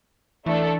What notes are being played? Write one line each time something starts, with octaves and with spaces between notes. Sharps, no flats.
E3 A3 D4 A4